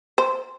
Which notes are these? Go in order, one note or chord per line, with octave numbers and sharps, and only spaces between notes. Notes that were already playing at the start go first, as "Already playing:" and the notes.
C5